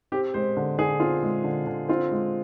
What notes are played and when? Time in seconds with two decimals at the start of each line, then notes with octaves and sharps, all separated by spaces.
0.12 C4 G4
0.34 G#3 C5
0.57 D3
0.78 D3 G#4
1.00 C4 F4
1.23 G#3
1.44 D3
1.66 D3
1.89 C4 F4
2.12 G#3